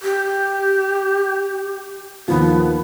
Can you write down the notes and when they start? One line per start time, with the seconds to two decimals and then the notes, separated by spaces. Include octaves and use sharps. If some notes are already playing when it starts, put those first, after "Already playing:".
0.02 G4
2.28 D#2 F3 B3